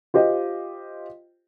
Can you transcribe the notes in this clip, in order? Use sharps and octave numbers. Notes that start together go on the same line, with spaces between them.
F4 G4 C5 D#5